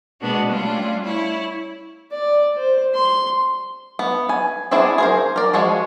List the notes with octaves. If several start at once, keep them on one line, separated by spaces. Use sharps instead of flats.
B2 G#3 B3 D4 F#4
G3 A3 C#4 D4 F4
E4 C#5
D5
C5
C6
B3
G#5
B3 C4 D4 E4 G#4
G#4 A#4 C5
A#4 D5
F3 G#3 F#4 G#4